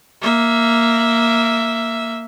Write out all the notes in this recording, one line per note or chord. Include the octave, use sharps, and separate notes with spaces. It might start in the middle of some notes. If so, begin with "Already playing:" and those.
A#3 E5